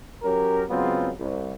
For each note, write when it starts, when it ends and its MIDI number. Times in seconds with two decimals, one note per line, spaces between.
0.22 0.63 54
0.22 0.63 61
0.22 0.63 67
0.22 0.63 70
0.69 1.10 49
0.69 1.10 54
0.69 1.10 56
0.69 1.10 59
0.69 1.10 60
0.69 1.10 65
1.18 1.53 36